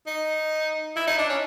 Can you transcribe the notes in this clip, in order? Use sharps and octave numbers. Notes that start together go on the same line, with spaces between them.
D#4
E4
D#4
D4
C#4